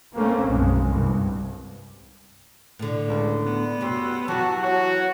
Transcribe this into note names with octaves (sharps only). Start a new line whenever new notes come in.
A3 A#3 C4 C#4
B1 F#2 G#3
C2 G2
A2 D3
C#2
B3
F#2 C#4 F#4 G4 C6 E6
E3 F#3 F#4 G4 A5
F#4 C#5